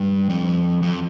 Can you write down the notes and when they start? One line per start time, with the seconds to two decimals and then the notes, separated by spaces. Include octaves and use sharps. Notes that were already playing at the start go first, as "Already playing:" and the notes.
Already playing: G2
0.29 F2
0.82 F2